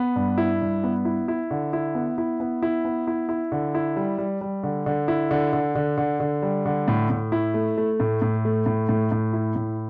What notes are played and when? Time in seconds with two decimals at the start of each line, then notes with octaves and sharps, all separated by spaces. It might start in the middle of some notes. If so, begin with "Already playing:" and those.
Already playing: B3
0.16 G2
0.38 E4
0.61 G2
0.84 B3
1.05 E4
1.28 E4
1.51 D3
1.73 E4
1.95 B3
2.18 E4
2.40 B3
2.62 E4
2.85 B3
3.07 E4
3.29 E4
3.52 D3
3.75 E4
3.96 G3
4.18 G3
4.41 G3
4.63 D3
4.86 D3
5.08 E4
5.31 D3
5.53 D3
5.75 D3
5.98 D3
6.20 D3
6.43 G3
6.65 D3
6.88 A2
7.10 A2
7.32 E4
7.54 A3
7.77 A3
8.00 A2
8.22 A2
8.45 A3
8.66 A2
8.89 A2
9.12 A2
9.33 E4
9.56 A2